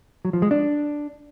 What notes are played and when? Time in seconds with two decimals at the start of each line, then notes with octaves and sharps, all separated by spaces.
0.25 F#3
0.33 F3
0.42 G#3
0.51 D4